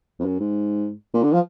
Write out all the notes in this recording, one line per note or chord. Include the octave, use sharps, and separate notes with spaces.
F2
F#2
G#2
A#2
D3
F3